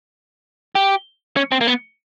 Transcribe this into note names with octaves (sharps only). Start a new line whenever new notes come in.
G4
C#4
C4
A#3
B3